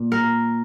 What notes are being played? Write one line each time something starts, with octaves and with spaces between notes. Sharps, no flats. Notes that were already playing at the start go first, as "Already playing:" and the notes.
Already playing: A#2
A#4